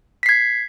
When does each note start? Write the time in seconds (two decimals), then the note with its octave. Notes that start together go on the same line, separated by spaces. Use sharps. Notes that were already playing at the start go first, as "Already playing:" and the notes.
0.23 B6
0.26 C7
0.29 G#6